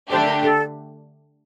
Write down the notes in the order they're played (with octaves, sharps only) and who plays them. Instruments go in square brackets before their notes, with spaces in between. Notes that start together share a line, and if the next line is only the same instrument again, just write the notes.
[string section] D3 A3 D4 G4 [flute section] C5
[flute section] A#4
A4